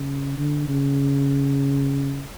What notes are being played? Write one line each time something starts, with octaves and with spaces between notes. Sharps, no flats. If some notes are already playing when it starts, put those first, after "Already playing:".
Already playing: C#3
D3
C#3